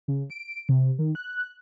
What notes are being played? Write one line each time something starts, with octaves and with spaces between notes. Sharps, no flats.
C#3
D7
C3
D#3
F#6